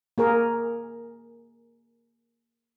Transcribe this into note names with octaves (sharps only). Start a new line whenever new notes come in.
A#3 G#4 A#4